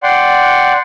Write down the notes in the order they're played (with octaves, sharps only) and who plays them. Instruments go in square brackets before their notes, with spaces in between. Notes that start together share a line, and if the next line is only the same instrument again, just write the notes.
[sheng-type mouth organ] D5 F#5 G5 C6